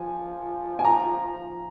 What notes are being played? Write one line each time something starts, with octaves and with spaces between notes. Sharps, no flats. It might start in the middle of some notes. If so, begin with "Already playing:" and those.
Already playing: F3 G#5
G#5
A#5